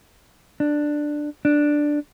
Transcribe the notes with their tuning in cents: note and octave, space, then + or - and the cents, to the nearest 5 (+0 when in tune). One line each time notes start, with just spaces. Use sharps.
D4 +10
D4 +5